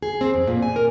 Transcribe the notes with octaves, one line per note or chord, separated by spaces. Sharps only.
G#4
C4
F2
A#2
G#5
A#4